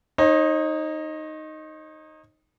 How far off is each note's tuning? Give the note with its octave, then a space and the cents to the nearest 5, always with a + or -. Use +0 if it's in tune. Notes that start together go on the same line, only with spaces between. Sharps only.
D#4 +0 C#5 -45